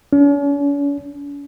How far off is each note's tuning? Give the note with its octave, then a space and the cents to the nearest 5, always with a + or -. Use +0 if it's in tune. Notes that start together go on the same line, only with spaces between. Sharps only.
C#4 +45